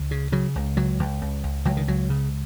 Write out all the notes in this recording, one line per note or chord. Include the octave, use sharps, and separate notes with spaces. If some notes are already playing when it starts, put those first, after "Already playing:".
Already playing: C#2
C#3
C#3 F#3
C#2
C#2 F#3
C#2
C#2
C#2
C#2 F#3
D#3
C#2 F#3
C#3